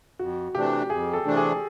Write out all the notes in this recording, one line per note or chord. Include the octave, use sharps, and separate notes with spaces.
F2 F#4
C3 E3 A3 D4 G4
F2 G#4
A4
C3 E3 A3 D4
G#4